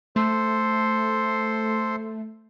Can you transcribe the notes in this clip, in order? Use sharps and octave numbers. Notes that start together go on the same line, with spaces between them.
A3 A4 C5 C6